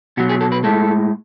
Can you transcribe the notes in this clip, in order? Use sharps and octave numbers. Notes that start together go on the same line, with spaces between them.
B2 F#3 F#4
G#4
A4
B4
A2 G#3 A4